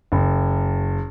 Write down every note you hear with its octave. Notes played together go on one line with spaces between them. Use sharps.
F#1